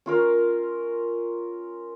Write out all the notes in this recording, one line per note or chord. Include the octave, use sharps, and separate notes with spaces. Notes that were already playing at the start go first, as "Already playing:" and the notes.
C#4 F4 A#4